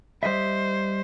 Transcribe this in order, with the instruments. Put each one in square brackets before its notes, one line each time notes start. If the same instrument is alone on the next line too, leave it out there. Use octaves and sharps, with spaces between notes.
[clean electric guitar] G3 D#5 E5 [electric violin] C5